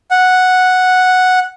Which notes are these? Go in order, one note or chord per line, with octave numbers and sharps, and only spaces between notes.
F#5